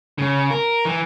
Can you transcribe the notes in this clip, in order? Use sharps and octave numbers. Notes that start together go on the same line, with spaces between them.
C#3
A#4
E3